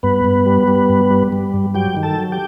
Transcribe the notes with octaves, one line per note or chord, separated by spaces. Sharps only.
G2 B3 B4
G2
G3
G3
G2
G3
G3
G2
F#3 G4 G5
D#3
A4 A5
F#3
G4 G5